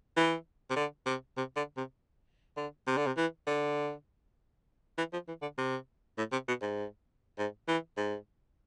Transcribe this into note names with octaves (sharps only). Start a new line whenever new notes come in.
E3
C3
D3
C3
C3
D3
C3
D3
C3
D3
C3
E3
D3
E3
F3
E3
D3
C3
A2
C3
B2
G#2
G#2
E3
G#2